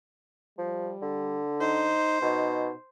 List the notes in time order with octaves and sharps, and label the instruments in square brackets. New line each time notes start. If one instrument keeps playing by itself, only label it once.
[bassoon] F3 [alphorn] G3
[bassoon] D3
[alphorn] D#4 [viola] C5
[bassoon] B2 [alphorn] D#4